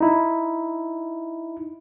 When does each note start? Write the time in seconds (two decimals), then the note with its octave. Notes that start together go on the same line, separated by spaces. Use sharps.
0.01 D#4 E4